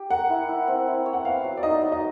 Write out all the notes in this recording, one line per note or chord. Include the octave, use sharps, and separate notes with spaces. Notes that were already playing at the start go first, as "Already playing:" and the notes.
Already playing: G4
A#4 F#5
E4
E4
C4
E4
C#5
F#5
B3 F5
F#3
D5
D#4 D#5
F#3
D#5